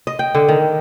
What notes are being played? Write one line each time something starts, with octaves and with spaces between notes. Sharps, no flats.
D#5
G5
D3
D#3